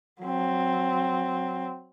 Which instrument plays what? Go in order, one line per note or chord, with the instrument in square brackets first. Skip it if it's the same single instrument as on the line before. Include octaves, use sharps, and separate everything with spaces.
[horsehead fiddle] F#3 C4